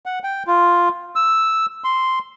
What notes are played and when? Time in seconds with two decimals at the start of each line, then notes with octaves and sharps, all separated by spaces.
0.06 F#5
0.24 G5
0.47 F4
1.16 E6
1.84 C6